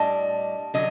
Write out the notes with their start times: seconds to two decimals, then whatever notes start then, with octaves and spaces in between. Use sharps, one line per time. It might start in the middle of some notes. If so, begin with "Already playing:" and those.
Already playing: A2 G3 D4 D#5
0.74 D3 F#3 D#5